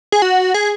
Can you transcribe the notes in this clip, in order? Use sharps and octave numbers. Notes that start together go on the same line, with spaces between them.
G#4
F#4
G#4